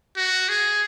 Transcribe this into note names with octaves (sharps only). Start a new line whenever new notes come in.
F#4
G#4